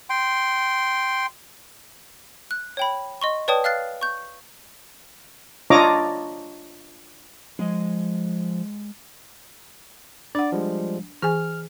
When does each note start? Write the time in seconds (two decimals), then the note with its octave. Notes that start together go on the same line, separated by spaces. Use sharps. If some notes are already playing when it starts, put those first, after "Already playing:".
0.10 G5 C6
2.51 F#6
2.77 C#5 G5 B5
3.22 D#5 C6 C#6
3.48 B4 C#5 D5 G5 A5 D#6
3.64 F5 F6 F#6 A6 C7
4.01 C#6 G6
5.70 D4 F4 C#5 D#5 A#5 D6
7.59 F3 G#3 D#5
10.35 D4 D5 F#5
10.52 F3 G3 G#3
11.22 E3 G#4 G#5 F6